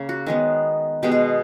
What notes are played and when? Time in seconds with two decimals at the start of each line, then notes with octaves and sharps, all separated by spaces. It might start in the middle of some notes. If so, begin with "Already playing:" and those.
Already playing: C#3 A#3
0.09 F#4
0.26 D#3 G#3 B3
1.03 B2 G#3 B3 G4
1.12 G#4